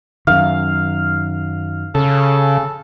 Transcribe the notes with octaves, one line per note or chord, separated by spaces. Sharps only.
F#2 D#3 F5
C#3 A4